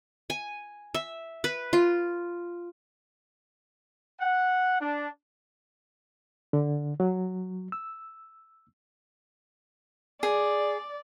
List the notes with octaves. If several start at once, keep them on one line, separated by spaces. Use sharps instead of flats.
G#5
E5
B4
F4
F#5
D4
D3
F#3
E6
G#4 D5